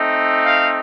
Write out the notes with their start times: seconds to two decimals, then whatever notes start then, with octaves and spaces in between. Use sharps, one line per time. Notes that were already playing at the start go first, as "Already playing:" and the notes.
Already playing: A3 C4 D#4
0.45 F5